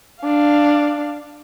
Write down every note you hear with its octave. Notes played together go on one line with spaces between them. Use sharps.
D4 F5